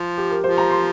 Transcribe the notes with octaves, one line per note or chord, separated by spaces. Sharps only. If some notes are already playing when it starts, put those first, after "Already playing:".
Already playing: F3
G4
A#4
F3 C5
A#5
C6